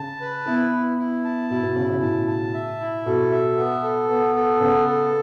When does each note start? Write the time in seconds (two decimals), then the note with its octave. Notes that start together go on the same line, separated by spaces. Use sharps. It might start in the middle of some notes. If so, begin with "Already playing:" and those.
Already playing: C#3 A5
0.21 B4
0.46 B3 E4
0.73 E4
0.98 E4
1.25 A5
1.50 B2 E4
1.63 B2
1.76 C#3 E4
1.89 C#3
2.02 A2 A5
2.27 A5
2.54 E5
2.80 E4
3.06 B2 A4
3.32 E5
3.57 B3
3.83 A4
4.09 B3
4.36 A4
4.61 C#3 B3
4.87 A4